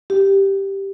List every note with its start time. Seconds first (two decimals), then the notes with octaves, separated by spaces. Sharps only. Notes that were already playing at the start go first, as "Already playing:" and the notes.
0.10 G4